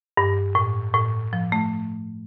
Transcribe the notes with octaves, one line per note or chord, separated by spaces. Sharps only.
G2
A2
A2
F3
A3